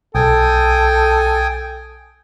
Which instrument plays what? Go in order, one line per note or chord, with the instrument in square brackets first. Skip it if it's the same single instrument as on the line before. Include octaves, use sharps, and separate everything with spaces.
[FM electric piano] B1 [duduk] A4 [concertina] G5 G#5 D#6